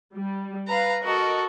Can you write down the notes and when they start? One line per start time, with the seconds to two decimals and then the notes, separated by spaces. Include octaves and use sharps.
0.15 G3
0.67 B4 F5 A#5
1.04 F#4 A4 A#4 D#5